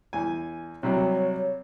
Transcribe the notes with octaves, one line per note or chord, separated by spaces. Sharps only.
E2 G#5
C3 F#3 G3 C#5